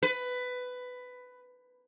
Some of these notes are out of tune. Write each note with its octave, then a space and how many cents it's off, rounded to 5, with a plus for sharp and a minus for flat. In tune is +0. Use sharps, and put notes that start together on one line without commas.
B4 +15